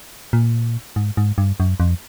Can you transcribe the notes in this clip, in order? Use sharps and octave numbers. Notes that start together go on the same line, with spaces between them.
A#2
G#2
G#2
G2
F#2
F2